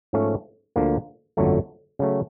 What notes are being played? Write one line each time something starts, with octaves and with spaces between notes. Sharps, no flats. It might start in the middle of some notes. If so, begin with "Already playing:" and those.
G#2 F3 A3 C#4
D2 D3 F3 A#3
G1 F2 D3 F#3 A3
C#3 F#3 A3